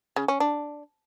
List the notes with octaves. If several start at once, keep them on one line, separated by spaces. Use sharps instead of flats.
C#3
C#4
D4